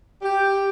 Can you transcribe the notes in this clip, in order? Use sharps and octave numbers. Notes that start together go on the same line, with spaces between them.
G4